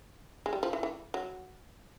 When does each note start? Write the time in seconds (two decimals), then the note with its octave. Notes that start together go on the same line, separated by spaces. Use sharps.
0.46 G#3
0.53 G3
0.63 F3
0.73 E3
0.83 E3
1.14 F#3